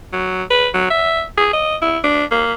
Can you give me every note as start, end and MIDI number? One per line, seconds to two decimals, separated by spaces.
0.13 0.43 54
0.50 0.68 71
0.74 0.88 54
0.90 1.23 76
1.38 1.48 68
1.53 1.76 75
1.82 1.98 64
2.04 2.25 62
2.31 2.54 58